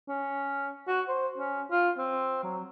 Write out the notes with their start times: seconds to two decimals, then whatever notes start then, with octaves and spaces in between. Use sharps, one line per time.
0.09 C#4
0.88 F#4
1.09 C5
1.38 C#4
1.71 F4
1.98 C4
2.44 F#3